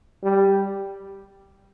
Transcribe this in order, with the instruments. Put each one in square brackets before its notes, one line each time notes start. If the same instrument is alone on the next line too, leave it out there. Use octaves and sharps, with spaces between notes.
[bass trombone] G3